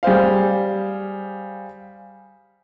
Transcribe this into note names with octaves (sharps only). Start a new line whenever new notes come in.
G3 G#4 C5 F5